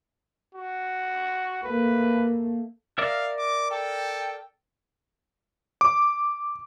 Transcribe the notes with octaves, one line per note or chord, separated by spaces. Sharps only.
F#4
A3 A#3 B4
A#4 D5 E5 F5
D6
A4 G5
D6